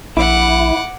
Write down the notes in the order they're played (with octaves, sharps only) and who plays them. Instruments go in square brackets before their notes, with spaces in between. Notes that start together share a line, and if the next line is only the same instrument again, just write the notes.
[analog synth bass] A#1 [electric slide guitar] E4 [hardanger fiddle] F#5 D6